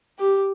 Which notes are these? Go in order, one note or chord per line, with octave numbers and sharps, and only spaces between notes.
G4